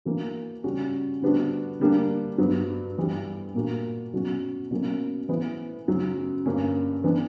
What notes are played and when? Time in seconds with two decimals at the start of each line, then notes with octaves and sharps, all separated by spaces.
0.05 E3 A#3 D4 F#4
0.64 C#3 G3 C#4 F#4
1.22 D3 G3 B3 D4 F#4
1.80 D3 G3 A#3 D4
2.38 G2 F#3 B3
2.97 G2 E3 G3
3.54 A#2 A#3 D4 F#4
4.13 B2 F#3 C#4 F#4
4.71 B2 F#3 A#3 C#4
5.29 E3 B3 E4
5.88 F#2 C#3 F#3
6.46 G2 D3 A#3 C#4
7.04 E3 B3 D4